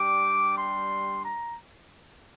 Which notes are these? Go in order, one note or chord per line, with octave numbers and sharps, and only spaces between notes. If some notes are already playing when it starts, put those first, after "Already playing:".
Already playing: G3 D4 G4 D6
C6
A#5